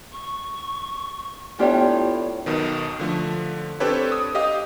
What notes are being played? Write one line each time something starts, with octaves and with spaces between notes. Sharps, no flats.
C#6
A2 B3 D4 F4 G4 C#5 D5 G5
B1 B2 D#3
D3 F3 A3
C4 D4 G4 A4 B4 C#5
D#6
G4 D#5 F5 D#6